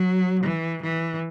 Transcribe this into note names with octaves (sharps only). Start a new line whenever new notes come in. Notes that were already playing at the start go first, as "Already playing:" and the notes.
Already playing: F#3
E3
E3